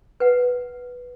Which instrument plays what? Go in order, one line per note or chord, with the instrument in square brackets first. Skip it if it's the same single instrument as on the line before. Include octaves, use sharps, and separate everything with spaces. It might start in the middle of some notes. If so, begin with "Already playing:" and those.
[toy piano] B4 F#5